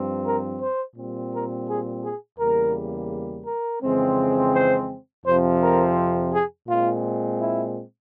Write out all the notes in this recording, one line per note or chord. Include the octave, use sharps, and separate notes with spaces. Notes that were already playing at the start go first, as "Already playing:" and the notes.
Already playing: G2 F3 C4
A#4
C5
A#2 G3 C4
A#4
G#4
G#4
E2 C#3 G3 A#3 A#4
A#4
F2 C#3 E3 G#3 C4
C5
F2 C3 F3 C4 C5
A#4
G#4
A#2 G#3 C4 F4
E4